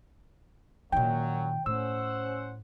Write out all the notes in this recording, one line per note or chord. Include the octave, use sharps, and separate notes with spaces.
F#2 A#2 D#3 F#3 G5
A2 C#4 C5 F#5 E6